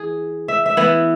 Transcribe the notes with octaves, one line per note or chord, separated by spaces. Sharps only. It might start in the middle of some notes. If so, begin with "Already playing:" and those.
Already playing: E3 G#4
E5
E5
E3 B3 E4 F#5